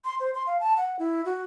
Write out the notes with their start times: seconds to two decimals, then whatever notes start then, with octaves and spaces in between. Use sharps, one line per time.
0.05 C6
0.20 C5
0.34 C6
0.47 F5
0.60 A5
0.77 F#5
0.99 E4
1.25 F#4